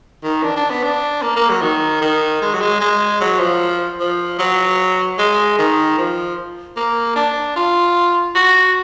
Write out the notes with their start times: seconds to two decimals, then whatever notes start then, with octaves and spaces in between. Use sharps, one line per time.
0.23 D#3
0.44 D4
0.56 D4
0.70 B3
0.84 D4
1.22 A#3
1.36 A#3
1.49 F#3
1.62 D#3
2.02 D#3
2.42 G#3
2.53 F#3
2.61 G#3
2.80 G#3
3.21 F#3
3.40 F3
4.00 F3
4.39 F#3
5.19 G#3
5.59 D#3
5.98 F3
6.77 A#3
7.16 D4
7.56 F4
8.35 F#4